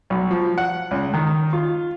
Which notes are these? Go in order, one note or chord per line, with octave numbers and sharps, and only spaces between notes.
B1
F3
F#5
C#2
D#3
F4